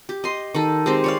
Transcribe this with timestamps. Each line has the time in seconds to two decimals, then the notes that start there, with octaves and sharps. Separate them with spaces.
0.09 G4
0.24 D#5 C6
0.54 D#3 A4
0.86 G#3 C4 G4
1.04 C#5 D5 F5